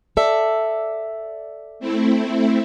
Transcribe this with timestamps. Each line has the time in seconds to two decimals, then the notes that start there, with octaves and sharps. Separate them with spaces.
0.17 A4 D5 E5
1.80 A3 C4 E4